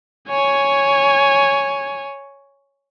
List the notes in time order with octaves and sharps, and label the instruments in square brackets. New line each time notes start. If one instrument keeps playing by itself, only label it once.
[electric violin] C#5 G#5